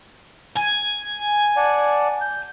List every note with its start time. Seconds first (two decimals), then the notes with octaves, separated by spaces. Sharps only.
0.56 G#5
1.57 D5 F#5 A5
2.21 G6